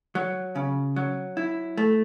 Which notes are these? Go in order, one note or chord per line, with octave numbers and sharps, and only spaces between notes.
F#3
C#3
F#3
E4
A3